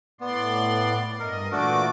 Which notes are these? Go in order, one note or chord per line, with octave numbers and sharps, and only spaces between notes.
A2 B3 D5 C6
G2 A#4 D#5
A#2 E3 A3 D4 F#4 D6